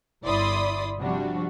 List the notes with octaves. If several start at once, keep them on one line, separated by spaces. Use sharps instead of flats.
G1 E4 D5 B5 C6 D#6
C3 F3 G3 D4 F#4